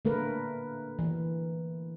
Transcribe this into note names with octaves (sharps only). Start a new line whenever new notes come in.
D3 A3 A#3 A#4 B4
E3